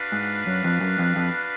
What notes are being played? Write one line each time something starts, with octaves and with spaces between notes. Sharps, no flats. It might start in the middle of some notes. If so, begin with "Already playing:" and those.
Already playing: D4 F#4 B4 F5
G#2
F#2
F2
F#2
F2
F2